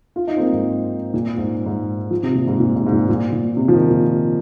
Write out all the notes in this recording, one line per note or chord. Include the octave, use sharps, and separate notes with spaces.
F4
D#4
C4
A#3
G#2
A#2
G#2
G#2
F3
C3
A#2
G#2
A#2
G#2
G#2
A#2
A#2
A#2
C3
F3
D#3
A#2